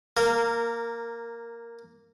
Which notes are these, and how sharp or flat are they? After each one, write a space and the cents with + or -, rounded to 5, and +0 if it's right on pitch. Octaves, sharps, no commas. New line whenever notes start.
A#3 +0 A#4 -20